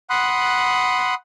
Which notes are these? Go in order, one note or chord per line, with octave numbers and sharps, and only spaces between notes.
F#5 B5 C6 D#6 F#6